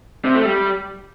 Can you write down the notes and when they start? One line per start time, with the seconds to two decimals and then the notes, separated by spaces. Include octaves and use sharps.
0.25 C3
0.35 A3
0.45 G3